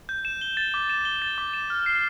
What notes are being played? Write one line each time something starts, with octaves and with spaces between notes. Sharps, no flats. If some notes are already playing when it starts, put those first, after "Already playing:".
G6
E7
G7
A6
D6
E7
G7
A6
D6
E7
F6
C7